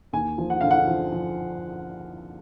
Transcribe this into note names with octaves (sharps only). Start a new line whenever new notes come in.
D#2 G#5
F3
F#5
D3 F5
F#5
F3
F3